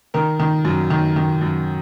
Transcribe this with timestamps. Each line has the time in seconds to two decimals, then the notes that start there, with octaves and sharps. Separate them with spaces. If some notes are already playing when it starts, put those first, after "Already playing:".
0.14 D#3 A#4
0.40 D#3
0.65 F#2
0.90 D#3
1.16 D#3
1.41 F#2